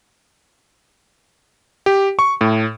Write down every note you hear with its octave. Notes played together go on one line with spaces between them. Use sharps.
G4
C#6
A2